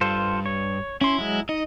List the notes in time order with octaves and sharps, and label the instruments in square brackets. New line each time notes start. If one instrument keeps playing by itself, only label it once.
[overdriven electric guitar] G2 [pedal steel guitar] F4 A4 C5
[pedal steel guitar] C#5
[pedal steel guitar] C#4 C6 [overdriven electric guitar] E4
[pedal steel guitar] F#3 G#3
[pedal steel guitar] D#4 [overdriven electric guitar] D#5